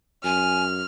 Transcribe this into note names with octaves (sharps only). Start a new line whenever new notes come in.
F#2 G#5 F6